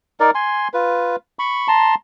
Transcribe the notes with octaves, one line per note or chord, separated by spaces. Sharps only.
D#4 A#4 D5
G#5 C6
F4 B4
B5 C#6
A5 A#5 C6